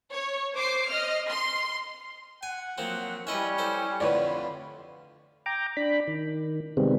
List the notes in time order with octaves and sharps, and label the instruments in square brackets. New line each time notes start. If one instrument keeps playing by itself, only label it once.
[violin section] C#5
C5 D6 C7
D#5 F6
C6
[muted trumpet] F#5 [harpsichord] G#5
[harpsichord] F3 A#3 C4 [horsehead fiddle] F#3
[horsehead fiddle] G3 E4 [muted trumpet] C#4 [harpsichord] B4 D#5 E5
[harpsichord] A4 C5
[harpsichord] F2 A2 D3 [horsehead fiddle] F4 B5 [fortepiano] B4 C#5 D5
[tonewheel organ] G5 A#5 D6
D4 B5
D#3
C3 D#3 G3 G#3 B3 C4